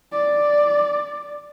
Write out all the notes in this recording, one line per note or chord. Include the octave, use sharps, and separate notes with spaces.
D5